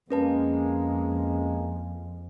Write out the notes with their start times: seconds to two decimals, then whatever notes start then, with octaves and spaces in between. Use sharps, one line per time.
0.10 F2 G#3 A#3 C#4 B4 A5